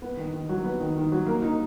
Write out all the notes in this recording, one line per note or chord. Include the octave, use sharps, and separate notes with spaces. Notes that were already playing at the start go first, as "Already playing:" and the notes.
B3
D#3
D#3
F#3
B3
D#3
D#3
F#3
A#3
D#4